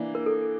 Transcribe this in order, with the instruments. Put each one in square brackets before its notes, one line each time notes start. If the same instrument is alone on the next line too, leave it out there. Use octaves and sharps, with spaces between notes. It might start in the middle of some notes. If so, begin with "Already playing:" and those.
Already playing: [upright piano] E3 A#3 D4
[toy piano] A#4
A4